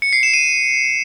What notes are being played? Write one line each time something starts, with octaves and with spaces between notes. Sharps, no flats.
C#7
C7
E7
D#7